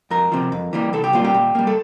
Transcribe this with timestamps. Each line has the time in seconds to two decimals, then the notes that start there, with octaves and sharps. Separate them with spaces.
0.10 F2 A#4
0.32 C3 F3
0.52 F2
0.73 E3 G3 A#3
0.93 C2 A4
1.04 G4
1.13 A#2 G3 A#3 F4
1.24 G4
1.34 A#2
1.55 G3 A#3
1.67 A4